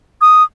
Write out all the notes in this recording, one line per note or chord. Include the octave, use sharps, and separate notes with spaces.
D#6